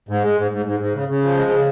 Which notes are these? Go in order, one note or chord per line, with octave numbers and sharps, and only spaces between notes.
G#2
G#3
G#2
G#2
G#2
G#2
C#3
C#3
F3
G#3
C#3